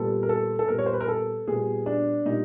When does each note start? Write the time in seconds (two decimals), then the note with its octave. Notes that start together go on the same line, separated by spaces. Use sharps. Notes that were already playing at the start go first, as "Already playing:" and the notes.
Already playing: A#2 G3 B3 A4
0.23 A#4
0.29 A4
0.59 A4
0.68 A#2 G3 B3 A#4
0.78 C#5
0.86 C5
0.93 B4
1.00 A#4
1.08 A4
1.48 A#2 G3 B3 G#4
1.86 D4
2.26 A#2 G3 A#3 D#4